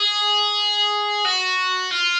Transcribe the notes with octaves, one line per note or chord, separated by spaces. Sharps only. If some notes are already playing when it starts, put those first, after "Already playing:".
Already playing: G#4
F#4
F4